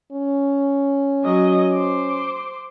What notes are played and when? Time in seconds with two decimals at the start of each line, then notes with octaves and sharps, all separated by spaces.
0.12 C#4
1.24 F#3 D#5
1.72 C5 D6